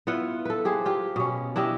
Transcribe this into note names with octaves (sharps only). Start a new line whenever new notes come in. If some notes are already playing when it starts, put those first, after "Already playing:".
B3 E4 F4 F#5
A4 B4
G4 G#4 C5
F4 G4
B2 C#4
D4 E4 G4 D#5